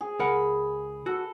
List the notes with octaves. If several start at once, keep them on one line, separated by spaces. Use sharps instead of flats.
G#4
C#2 A#4 F#5 B5
F#4 A4